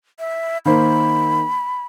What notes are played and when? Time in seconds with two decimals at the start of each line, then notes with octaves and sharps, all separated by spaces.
0.19 E5
0.65 D#3 A#3 C5 B5